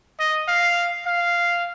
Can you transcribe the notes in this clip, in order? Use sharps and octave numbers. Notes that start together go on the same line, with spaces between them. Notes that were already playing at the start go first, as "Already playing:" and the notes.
D#5
F5
F5